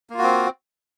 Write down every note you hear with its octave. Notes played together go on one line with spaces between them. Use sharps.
A#3 C4 F4 F#4